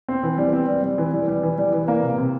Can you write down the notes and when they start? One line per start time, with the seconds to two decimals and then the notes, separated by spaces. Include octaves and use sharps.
0.08 C4
0.23 E3
0.38 G3
0.53 C4
0.68 G3
0.83 G3
0.98 E3
1.13 G3
1.28 G3
1.43 E3
1.58 G3
1.73 E3
1.88 A#3
2.03 C3
2.18 C3